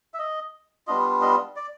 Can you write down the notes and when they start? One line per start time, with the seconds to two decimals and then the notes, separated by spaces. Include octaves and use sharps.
0.14 E5
0.19 D#5
0.87 G3 B3 D4 F4 D#5
1.22 D#5
1.56 D5